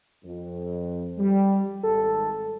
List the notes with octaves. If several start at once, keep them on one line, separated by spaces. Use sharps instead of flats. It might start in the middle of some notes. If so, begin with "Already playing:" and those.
F2
G3
G#1 A4